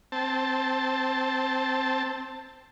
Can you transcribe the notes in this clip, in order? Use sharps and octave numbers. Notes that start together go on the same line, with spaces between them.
C4 A5